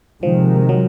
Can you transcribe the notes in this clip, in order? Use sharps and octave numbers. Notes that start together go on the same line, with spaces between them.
C3 D#3 F3 G#3
F#3